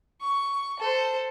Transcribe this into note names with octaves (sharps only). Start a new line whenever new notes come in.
C#6
A4 C5